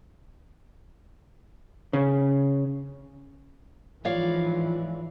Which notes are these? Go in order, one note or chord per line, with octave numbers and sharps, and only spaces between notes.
C#3
G#2 E3 F3 F4 C#5 D5 F5